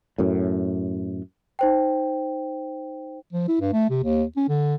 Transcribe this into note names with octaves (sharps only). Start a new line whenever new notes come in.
F#2 A2
D#4 C5 G5
F3
E4
G2
A3
C3
D#2
C#4
D3